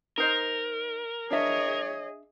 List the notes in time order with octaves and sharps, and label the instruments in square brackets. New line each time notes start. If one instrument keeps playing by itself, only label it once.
[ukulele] D#4 C5 D#5 [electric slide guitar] A#4
[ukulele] D4 E5 [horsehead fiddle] G#4 D#5 [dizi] C#5